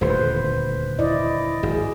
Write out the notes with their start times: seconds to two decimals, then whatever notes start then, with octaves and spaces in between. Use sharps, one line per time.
0.01 D#1 D2 B4 C5
0.99 E4 D5 D#5
1.63 G#1 G#4